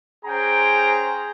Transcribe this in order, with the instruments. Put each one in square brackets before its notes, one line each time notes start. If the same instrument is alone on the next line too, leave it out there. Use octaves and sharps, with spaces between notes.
[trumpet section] C#4 G#4 C5 G5 G#5 A#5